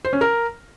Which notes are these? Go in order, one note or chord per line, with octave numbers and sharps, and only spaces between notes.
C5
C#4
A#4